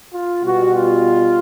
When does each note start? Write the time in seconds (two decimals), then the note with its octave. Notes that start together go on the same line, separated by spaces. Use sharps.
0.12 F4
0.43 B2 G3 B3 F#4
0.74 F4